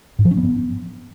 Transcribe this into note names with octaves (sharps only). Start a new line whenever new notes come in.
G#2
F3
C#4
B3